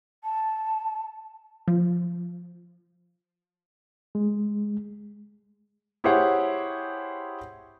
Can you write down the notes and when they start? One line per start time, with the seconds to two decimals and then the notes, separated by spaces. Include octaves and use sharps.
0.23 A5
1.68 F3
4.15 G#3
6.04 E4 G4 G#4 C5 C#5 F#5